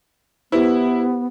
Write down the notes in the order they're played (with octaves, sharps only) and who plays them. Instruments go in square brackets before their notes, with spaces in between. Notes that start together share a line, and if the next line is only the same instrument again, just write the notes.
[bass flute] B3 [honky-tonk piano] E4 [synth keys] G4 B4 C5